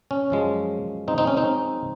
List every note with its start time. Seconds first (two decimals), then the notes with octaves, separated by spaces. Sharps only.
0.11 C#4
0.30 F#2 F3 G#3
1.08 C4 D#4
1.18 C4 D#4
1.27 C#4
1.37 C4 D#4